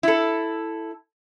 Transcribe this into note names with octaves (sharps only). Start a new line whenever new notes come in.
E4 A4